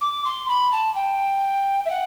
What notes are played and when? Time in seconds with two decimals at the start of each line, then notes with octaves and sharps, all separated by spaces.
0.01 D6
0.25 C6
0.49 B5
0.72 A5
0.95 G5
1.86 E5
1.90 F#5